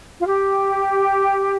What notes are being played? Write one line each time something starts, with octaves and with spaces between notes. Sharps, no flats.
F4
G4